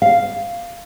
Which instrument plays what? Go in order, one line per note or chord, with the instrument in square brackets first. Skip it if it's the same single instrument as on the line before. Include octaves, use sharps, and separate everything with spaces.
[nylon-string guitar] F5